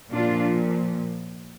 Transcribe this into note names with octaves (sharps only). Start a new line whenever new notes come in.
A#2 F3 D4 F4